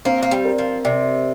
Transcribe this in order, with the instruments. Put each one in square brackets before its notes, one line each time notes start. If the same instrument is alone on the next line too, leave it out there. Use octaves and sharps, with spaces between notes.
[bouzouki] A#3 [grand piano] C4
[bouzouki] A#3
G3
[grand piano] A#4
[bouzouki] F3
[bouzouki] C3 [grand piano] D5